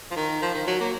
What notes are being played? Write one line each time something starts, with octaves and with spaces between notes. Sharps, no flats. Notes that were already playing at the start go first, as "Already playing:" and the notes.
F3
D#3
F3
D#3
F#3
A#3